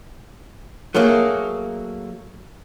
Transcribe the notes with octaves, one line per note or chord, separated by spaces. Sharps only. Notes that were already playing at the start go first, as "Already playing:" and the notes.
F#3 A3 A#3 G#4